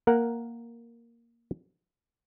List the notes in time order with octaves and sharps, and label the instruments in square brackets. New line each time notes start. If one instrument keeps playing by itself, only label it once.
[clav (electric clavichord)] A#3 A#4 F#5